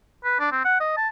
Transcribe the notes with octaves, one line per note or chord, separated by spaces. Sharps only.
B4
D4
C4
F#5
D#5
A5